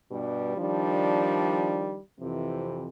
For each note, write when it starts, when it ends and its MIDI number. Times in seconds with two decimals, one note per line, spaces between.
0.11 0.57 43
0.11 0.57 47
0.11 0.57 55
0.57 1.98 51
0.57 1.98 53
0.57 1.98 55
0.57 1.98 62
2.20 2.88 41
2.20 2.88 48
2.20 2.88 52